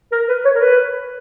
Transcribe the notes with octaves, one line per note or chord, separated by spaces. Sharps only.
A#4
B4
C#5
A#4
B4